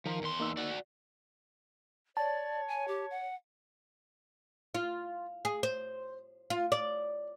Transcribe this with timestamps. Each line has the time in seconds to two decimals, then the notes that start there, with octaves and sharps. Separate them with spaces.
0.06 D#3 F3 A#4
0.22 E2 C6
0.40 A#3 D#4 E6
0.57 F#4 D5
2.17 C#5 D5 A5
2.68 G#5
2.88 G4
3.10 F#5
4.74 F4
5.45 G#4
5.63 C5
6.50 F4
6.72 D5